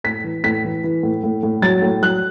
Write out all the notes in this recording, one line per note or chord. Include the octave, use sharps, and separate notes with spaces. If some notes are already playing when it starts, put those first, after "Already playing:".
A2 B6
E3
A2 B6
E3
E3
A2
A2
A2
F#3 A6
A2
F#3 F#6